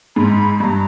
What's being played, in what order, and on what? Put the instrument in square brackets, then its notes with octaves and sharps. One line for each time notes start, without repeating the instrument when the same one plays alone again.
[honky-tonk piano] G#2 [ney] B5
[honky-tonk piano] G2 [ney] A#5 B5